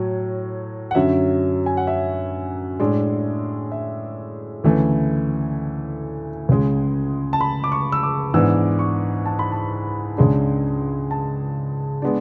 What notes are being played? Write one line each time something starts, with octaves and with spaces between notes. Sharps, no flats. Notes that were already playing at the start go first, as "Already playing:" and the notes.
Already playing: A2 F#3
F#5
F#2 D3 F#3 C#4 E5
G#5
F#5
E5
A2 G#3 D4
E5
D2 C#3 E3 A3
C#2 C#3 G#3
A5
B5
D6
C#6
E6
D6
G#2 E3 B3 D4 E6
C#6
A5
B5
A5
C#2 C#3 G#3 D4
A5
G#3 B3 D4